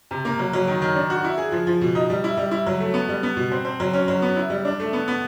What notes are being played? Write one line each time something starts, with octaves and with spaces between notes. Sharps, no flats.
C3
A#3
F#3
F#3
D#3
D#3
D4
F#4
E4
G#4
F3
F3
B2
D#4
G3
E4
G3
E4
F#3
A3
B3
G3
B3
B2
C4
C4
F#3
C#4
F#3
B3
E4
G3
D4
A3
B3
B3